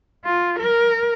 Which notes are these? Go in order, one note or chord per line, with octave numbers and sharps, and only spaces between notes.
F4
A#4